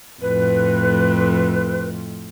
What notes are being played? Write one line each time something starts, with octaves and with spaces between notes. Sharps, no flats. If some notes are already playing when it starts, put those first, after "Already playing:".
F2 A2 B4